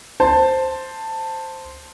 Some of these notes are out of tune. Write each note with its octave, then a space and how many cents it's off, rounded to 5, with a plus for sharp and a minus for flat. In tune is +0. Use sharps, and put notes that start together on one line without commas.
C5 +0 A5 +10